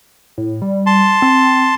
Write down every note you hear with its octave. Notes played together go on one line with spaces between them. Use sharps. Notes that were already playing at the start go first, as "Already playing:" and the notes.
A2
G3
A5 C6
C4